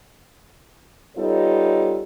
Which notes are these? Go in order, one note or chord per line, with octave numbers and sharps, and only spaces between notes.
G3 B3 D#4 F4 A4 C#5